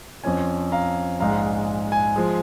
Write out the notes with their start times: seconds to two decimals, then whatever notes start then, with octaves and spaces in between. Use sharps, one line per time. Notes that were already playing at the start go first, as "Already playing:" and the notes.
0.24 F2 F3 C#4 G#5
0.72 F5 A#5
1.20 A#1 G#2 G#3 F5 A#5
1.92 G#5
2.16 F3 G#3